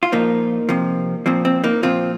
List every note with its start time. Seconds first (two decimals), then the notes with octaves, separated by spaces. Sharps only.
0.03 F4
0.12 A#2 F3 A#3 D#4
0.69 C3 F3
1.26 A#2 F3 C4
1.45 C4
1.64 A#3 D#4
1.83 A#2 F3 C4 F4